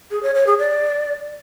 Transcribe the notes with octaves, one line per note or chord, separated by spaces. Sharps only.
G#4
C#5
C#5
G#4
D5